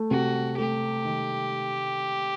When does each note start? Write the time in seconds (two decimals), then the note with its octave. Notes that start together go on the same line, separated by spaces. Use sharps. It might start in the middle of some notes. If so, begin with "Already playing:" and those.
Already playing: A3
0.11 C3 F#4
0.57 A3 G4
1.05 D#3